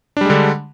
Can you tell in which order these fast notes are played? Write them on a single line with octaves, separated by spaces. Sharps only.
D4 G3 G#3 D3